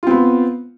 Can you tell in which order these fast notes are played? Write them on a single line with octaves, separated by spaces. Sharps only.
F4 C4 B3